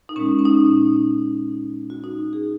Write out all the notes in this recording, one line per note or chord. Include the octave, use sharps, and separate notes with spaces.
D#4
A#2 G#3 C#4
C#4
D#4
F#4
D#4
G#4